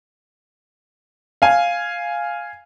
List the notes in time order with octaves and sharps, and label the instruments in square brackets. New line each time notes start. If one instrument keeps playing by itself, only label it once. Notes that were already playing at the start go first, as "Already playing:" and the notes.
[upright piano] F5 G#5